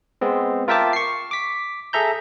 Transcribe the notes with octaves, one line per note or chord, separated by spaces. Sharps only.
G#3 B3 C4
F4 A#4 E5 G5 A5 D6
C#6 C7
D6 B6
G#4 A4 E5 A#5 G6